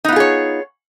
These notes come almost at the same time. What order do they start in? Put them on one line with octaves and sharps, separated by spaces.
D#4 B3 F4 G#4 C#5